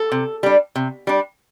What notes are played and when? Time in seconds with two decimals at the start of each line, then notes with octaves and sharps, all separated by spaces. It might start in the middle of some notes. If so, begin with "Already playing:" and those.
Already playing: A4
0.12 C3
0.43 G3 D4
0.75 C3
1.07 G3 D4